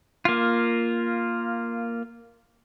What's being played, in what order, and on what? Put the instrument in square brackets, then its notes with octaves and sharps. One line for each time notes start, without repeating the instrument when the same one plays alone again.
[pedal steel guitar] A#3 F4